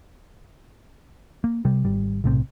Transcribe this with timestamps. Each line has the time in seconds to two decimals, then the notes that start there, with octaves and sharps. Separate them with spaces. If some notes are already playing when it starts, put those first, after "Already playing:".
1.44 A#3
1.65 C3 G3
1.84 G#1 G3
2.24 B1 A2 C3